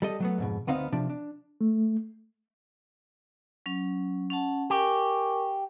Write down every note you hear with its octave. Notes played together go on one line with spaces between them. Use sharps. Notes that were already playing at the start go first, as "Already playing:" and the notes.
G3 A4 D#5
F#3 A3 B3
F2 G#2 B2
D2 B3 C4 D#4 F5
C3 F3 D4
D4
A3
F#3 C#4
C#4 F#5 A5
G4 A#4 G#5 C#6